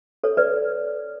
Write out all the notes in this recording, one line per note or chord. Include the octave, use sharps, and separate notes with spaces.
A4 C#5
B4 D5